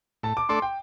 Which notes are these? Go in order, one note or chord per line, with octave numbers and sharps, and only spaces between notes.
A2 A5
D6
A3 D4 A4 D5 C6
G5